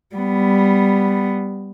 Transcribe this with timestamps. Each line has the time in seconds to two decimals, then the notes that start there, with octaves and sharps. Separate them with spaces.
0.16 G3 B3